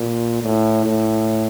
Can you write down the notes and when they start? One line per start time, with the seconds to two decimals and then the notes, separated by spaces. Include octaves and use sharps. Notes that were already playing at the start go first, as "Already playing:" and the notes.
Already playing: A#2
0.43 A2
0.85 A2